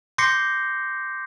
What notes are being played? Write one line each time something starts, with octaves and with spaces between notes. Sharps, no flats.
C6 D6 G6 A#6 C7 C#7